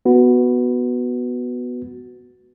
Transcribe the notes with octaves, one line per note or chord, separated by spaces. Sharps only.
B3 F#4 B4